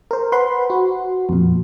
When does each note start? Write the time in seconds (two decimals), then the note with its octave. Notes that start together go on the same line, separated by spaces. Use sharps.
0.11 A#4 C5
0.32 B4 C5 F#5 B5 C6
0.70 F#4
1.29 F2 A#2